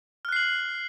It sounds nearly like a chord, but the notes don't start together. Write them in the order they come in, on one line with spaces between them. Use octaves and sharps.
F6 F#6 C7 F#7